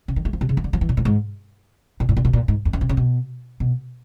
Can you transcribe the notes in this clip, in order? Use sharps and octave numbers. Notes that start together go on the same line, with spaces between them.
C#3
D#3
A3
F3
C3
C#3
E3
D3
F3
E3
A#2
A2
G#2
A#2
A2
A#2
B2
A#2
G#2
F2
F#2
C3
C#3
B2
B2